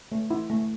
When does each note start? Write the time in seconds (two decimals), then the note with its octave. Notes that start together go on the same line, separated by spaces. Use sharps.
0.12 A3
0.31 E4
0.50 A3